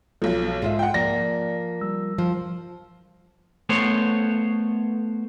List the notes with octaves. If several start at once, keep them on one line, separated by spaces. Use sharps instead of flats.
B1 F3 A4
G#2 G#3 F4 E5
F#5 G5
F3 A#3 D5 A#6
G3 E6
F3
A3 B3 C5 C#5